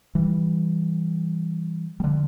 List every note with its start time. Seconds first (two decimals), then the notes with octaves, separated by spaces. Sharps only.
0.15 E3 G3
2.00 G3
2.04 D3 F3